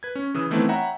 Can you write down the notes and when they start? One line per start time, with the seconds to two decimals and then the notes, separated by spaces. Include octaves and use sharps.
0.03 B4 G#6
0.15 C#4
0.34 C#3 E3 D#6 E6
0.51 D#3 E3 A3 B3 C4 E4
0.69 C#5 E5 F#5 G5 A#5 B5